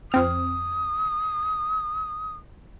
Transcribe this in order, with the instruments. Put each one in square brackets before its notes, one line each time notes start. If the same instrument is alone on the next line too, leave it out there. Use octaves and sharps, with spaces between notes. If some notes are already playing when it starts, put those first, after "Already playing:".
[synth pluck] F2 C4 F6 [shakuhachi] D#6